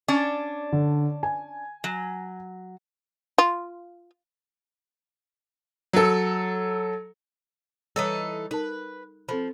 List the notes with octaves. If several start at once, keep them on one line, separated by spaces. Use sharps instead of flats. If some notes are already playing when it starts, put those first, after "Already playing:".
C#4 D4 D5
D3
G#5
F#3
F4
F#3 A4
E3 G3 D#4 A4 C#5 D#6
D#4 A#4 B4 A5
F3 C4 A4 B5